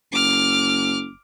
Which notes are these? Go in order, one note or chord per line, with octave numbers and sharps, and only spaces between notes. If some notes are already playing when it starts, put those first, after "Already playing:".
F#1 D6 F6